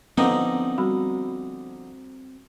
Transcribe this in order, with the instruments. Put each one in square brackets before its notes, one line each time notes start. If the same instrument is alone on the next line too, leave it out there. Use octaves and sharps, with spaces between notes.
[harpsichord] D3 F3 D#4 [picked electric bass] B3 [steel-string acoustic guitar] C4 A#5 [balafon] B4
[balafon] G3 F#4 B5